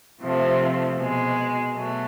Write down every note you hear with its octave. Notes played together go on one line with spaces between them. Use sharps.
C3 F3 A3
B2 G#3
B2 F#3 A3